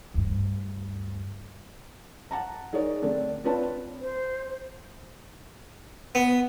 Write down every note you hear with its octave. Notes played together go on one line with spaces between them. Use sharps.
D2 G2
F#5 A5 A#5
D#4 G#4 A#4 C#5 D5
D3 A3 C4 D4
C4 D4 F4 B4 C#5 A5
C5
B3